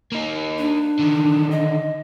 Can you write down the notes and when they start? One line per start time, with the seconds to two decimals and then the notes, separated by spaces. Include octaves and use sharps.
0.12 A#3 D#4
0.59 D4
0.99 D3 D#3
1.51 D#5